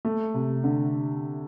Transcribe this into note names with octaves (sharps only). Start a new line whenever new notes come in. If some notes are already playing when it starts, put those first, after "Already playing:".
A3
C3
D3